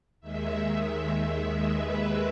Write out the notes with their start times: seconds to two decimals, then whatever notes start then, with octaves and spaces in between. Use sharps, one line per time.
0.21 D#2 D#3 G#3 E5
1.71 B4